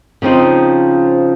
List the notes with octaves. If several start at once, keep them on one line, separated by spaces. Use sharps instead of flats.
C#3 F3 C4 D#4